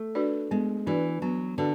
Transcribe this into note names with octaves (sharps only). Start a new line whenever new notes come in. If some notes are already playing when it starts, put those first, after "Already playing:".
Already playing: A3
D4 F#4 B4 D5
G#3 B3
E3 D4 F#4 B4 D5
F#3 B3
D3 D4 F#4 B4 D5